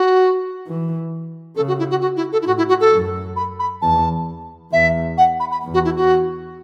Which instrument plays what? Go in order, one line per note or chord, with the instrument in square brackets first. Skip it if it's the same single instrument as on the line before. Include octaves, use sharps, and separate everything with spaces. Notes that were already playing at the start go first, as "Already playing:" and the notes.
Already playing: [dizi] F#4
[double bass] E3
[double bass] C#3 [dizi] A4
[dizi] F#4
E4
F#4
F#4
E4
A4
E4
[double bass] A2 [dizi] F#4
[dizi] E4
F#4
A4
[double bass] F#2
[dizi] B5
B5
[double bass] E2 [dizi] A5
[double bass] E2 [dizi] E5
[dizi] F#5
B5
B5
[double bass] E2
[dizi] F#4
E4
F#4